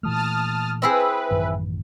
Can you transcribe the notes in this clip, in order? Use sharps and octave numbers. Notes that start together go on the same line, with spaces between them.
A#2 E3 A3 A5 D#6 F6
C4 E4 G#4 B4
A1 F#2 D#3